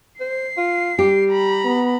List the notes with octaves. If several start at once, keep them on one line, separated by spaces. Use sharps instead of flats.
C5 C7
F4
G3 G4
A#5 B5
B3